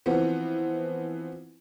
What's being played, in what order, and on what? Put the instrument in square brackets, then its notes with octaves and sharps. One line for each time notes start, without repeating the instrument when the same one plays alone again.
[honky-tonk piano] E3 F3 B3 C4